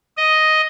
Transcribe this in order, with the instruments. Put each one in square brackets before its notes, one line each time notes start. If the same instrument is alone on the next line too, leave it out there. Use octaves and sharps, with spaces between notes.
[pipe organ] D#5